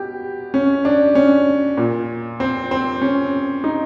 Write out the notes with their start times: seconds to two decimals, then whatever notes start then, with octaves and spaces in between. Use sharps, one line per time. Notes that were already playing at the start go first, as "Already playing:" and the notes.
Already playing: B2 G4
0.54 C#4
0.85 D4
1.15 C#4
1.77 A#2
2.40 C4
2.71 C4
3.01 C#4
3.64 D#4